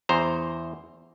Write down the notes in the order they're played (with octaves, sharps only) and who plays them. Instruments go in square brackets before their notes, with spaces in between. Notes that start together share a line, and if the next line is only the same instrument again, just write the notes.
[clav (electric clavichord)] E2 C5 A#5